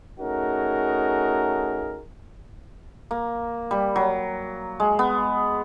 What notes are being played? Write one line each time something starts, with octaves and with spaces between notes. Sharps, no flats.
A3 C#4 D#4 F#4 G#4 A#4
A#3
G3
F#3
G#3
B3